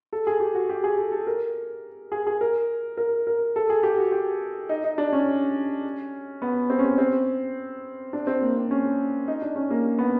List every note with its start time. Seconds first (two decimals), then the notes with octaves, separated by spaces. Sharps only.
0.13 A4
0.27 G#4
0.40 G4
0.55 F#4
0.69 G4
0.84 G#4
0.98 A4
1.12 A4
1.27 A#4
2.12 G#4
2.27 G#4
2.41 A#4
2.97 A#4
3.27 A#4
3.56 A4
3.70 G#4
3.83 G4
3.98 F#4
4.12 G4
4.69 D#4
4.84 D#4
4.98 D4
5.13 C#4
6.42 B3
6.70 C4
6.79 C#4
6.85 C4
6.98 C4
8.13 D4
8.27 C4
8.42 A#3
8.56 C4
8.71 C#4
9.28 D#4
9.42 D4
9.56 C#4
9.70 A#3
9.98 B3